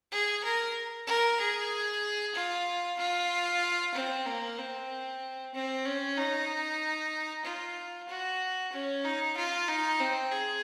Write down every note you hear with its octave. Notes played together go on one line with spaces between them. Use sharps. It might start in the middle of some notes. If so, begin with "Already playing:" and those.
G#4
A#4
A#4
G#4
F4
F4
C4
A#3
C4
C4
C#4
D#4
F4
F#4
C#4
D#4
F4
D#4
C4
G#4